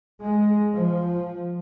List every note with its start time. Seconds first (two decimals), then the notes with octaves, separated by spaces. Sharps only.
0.21 G#3
0.77 F3